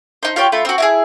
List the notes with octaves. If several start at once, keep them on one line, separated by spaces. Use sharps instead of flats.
D#4 C5
F4 G4 C#5 G5
A3 F4 B5
C4 F#4
E4 F#4 G#4